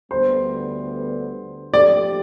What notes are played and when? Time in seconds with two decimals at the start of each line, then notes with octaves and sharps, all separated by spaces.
0.11 D2 D3 G3 B3 C5
1.74 F3 A3 D4 G4 D5